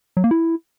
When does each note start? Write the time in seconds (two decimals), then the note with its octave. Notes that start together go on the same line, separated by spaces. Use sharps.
0.17 F#3
0.24 A#3
0.31 E4